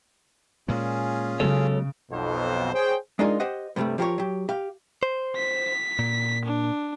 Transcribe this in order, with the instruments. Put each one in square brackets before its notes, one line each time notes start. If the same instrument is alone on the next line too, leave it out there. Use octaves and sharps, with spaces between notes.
[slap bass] A#2 G#3 [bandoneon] C#4 F4 G#4
[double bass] C#3 [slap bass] F#3 G#3 B3 [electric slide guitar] A4 C#5
[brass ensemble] B1 F2 B2 C5
G#4 C5 C#5 G5
[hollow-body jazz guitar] G#3 D4 D#4 F4 G#4 A#4
G4 C5 D#5 F#5
G2 C3 F3 G3 A3
F3 F4 G4 A4 A#4 C#5
F#3 G4
G4 F5
[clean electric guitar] C5
[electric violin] B6
[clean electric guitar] A#2
[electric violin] D4